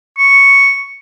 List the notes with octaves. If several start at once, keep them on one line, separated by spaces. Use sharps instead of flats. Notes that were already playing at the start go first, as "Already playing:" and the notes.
C#6